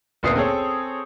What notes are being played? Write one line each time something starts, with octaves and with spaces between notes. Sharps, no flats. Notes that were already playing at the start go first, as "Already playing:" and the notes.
F#1 D2 A#2 B3 D#6 C7
C4 G#4 A4 C#5